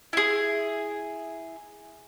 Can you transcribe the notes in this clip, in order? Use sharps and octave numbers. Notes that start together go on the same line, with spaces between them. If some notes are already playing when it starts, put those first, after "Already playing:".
E4 G#4